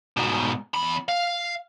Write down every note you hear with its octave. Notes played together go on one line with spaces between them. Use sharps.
G#2 B2
E2 B5
F5